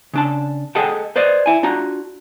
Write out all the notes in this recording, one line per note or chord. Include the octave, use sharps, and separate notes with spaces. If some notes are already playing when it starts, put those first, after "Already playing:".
C#3 D4 A5
G#4 A4 D#5 F#5 G5 A5
B4 C5 D5 D#5
E4 G#5
D4 F4 F#4 A#5